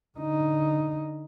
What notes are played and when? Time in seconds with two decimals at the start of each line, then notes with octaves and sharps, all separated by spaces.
0.18 D3 D#4